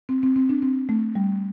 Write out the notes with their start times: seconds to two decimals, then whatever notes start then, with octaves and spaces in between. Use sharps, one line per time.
0.09 C4
0.23 C4
0.36 C4
0.49 D4
0.62 C4
0.89 A3
1.15 G3